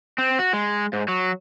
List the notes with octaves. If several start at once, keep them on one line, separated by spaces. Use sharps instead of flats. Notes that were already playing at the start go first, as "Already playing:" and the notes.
C4
F#4
G#3
G#2
F#3